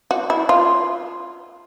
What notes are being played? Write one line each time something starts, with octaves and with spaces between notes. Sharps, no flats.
F#4
E4
F4